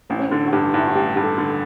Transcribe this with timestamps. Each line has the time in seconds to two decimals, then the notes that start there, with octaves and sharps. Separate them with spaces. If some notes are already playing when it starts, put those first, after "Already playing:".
0.10 A1 D4
0.19 C#4
0.29 D3 D4
0.46 F#4
0.52 G2 G4
0.74 G2 E4
0.87 F#4
0.95 A1 G4
1.16 G2 G4
1.24 A4
1.38 D3